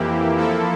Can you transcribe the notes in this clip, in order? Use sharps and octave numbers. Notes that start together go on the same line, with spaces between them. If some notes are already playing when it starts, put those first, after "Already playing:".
Already playing: F2 E3 A#3 E4 G4
F3 A#3 E4 A4